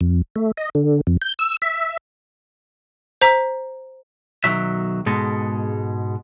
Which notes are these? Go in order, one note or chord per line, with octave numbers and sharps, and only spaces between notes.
F2
A3
D#5
D3
F2
G6
E6
E5
C5 A#5 B6
B1 D#3 F#3 E5
G#2 B2 G#3 A4